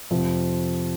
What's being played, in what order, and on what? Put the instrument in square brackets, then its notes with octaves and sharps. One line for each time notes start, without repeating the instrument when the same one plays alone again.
[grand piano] F2 C3 F3 C4